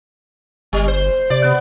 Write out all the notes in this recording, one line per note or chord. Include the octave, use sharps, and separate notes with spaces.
G1 G3
C5
C3 D5
B3